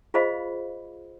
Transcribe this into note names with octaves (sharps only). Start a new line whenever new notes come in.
F4 G#4 C5 D#5 F5 B5